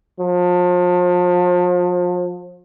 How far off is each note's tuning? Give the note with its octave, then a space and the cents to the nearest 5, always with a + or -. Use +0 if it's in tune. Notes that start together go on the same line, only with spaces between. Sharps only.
F3 +35